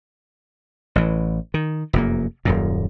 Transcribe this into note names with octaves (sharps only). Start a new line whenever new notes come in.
A1 E3
D#3
F1 F#2 A#3
D#1 F#2 A#2